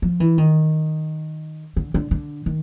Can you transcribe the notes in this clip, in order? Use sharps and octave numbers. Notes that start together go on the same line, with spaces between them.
F3
E3
D#3
D3
D3
D3
D#3